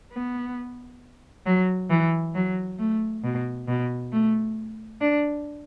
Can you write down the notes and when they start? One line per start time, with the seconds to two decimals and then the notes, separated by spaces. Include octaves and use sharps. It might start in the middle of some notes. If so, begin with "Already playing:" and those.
0.13 B3
1.46 F#3
1.90 E3
2.35 F#3
2.79 A3
3.24 B2
3.68 B2
4.12 A3
5.01 D4